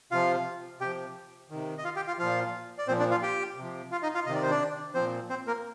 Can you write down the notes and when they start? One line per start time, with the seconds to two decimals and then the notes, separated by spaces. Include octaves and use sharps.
0.11 C3 F3 F4 F5
0.81 C3 F3 G4 G5
1.50 C3 D#3
1.78 D#5
1.84 F4 F5
1.96 G4 G5
2.07 F4 F5
2.18 A#2 F3 F4 F5
2.78 D5
2.88 A#2 F3 C4 C5
2.99 D4 D5
3.11 F4 F5
3.22 G4 G5
3.57 C3 F3
3.92 F4 F5
4.03 D#4 D#5
4.14 F4 F5
4.26 C3 D#3 D#5
4.34 D5
4.43 C5
4.50 D4 D5
4.95 A#2 F3 C4 C5
5.30 C4 C5
5.47 A#3 A#4